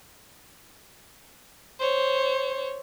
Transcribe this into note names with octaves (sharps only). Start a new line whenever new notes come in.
C5 C#5